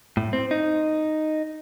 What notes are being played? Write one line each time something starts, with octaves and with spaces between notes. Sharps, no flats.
A2
C4
D#4